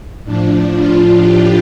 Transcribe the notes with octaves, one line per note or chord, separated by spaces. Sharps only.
A2 F3 D4
F4
G4